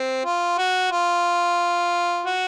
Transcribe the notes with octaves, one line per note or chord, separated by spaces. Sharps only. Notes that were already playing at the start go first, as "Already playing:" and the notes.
Already playing: C4
F4
F#4
F4
F#4